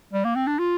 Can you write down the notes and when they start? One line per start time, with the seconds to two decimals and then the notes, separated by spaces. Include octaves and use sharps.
0.13 G3
0.24 A#3
0.36 C4
0.47 D4
0.59 F4